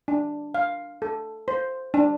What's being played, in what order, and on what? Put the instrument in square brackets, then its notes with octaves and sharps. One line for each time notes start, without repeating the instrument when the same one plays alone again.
[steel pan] D4
F5
A4
C5
D4